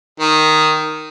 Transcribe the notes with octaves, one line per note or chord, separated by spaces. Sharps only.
D#3